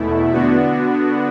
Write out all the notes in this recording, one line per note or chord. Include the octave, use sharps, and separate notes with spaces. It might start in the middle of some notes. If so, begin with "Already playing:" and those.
Already playing: E2 B2 A3 E4
D3 B3 D4 F#4